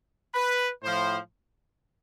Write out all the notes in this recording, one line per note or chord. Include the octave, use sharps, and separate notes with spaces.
B4
A2 F3 C5